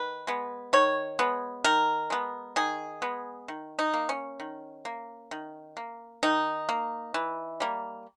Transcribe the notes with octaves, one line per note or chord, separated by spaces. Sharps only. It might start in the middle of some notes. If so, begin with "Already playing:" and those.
Already playing: D#3 B4
G#3 B3
D#3 C#5
G#3 B3
D#3 A#4
G#3 B3
D#3 G#4
G#3 B3
D#3
D#4
A#3
C#4
D#3
A#3
D#3
A#3
D#3 D#4
A#3
E3
G3 A#3